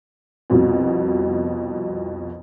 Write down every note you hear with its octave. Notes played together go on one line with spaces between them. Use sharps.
C2 F2 B2